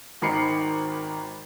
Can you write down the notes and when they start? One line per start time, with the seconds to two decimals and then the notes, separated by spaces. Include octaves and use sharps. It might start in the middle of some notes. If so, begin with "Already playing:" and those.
0.22 G#1 D#3 A#4 B5 C7 C#7